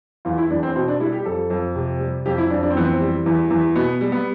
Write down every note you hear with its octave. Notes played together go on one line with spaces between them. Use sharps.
E2 F4
E4
E2 D4
C4
B2 C4
D4
G3 E4
G4
F2 A4
F2
C3
G3
F2 G4
E4
F2 D4
D4
C4
E3 B3
C4
G3
E2
E2
B2 B3
G3
B3